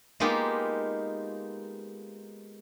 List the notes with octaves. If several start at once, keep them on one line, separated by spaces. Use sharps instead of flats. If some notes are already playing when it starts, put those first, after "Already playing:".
G#3 A#3 B3 D#4 F4 G4